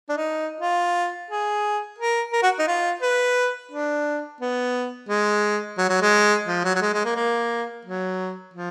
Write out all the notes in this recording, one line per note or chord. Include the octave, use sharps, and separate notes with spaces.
D4
D#4
F4
G#4
A#4
A#4
F#4
D#4
F4
B4
D4
B3
G#3
F#3
F#3
G#3
F3
F#3
F#3
G#3
G#3
A#3
A#3
F#3
F3